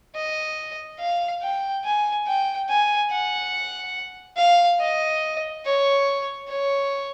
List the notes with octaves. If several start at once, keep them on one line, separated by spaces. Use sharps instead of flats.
D#5
F5
G5
G#5
G5
G#5
F#5
F5
D#5
C#5
C#5